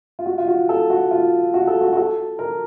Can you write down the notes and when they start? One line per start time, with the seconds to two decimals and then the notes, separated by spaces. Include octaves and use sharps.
0.19 F4
0.26 F#4
0.38 F4
0.48 F#4
0.69 A4
0.90 F#4
1.11 F4
1.54 F#4
1.67 A4
1.81 F#4
1.93 F#4
1.97 A4
2.39 A#4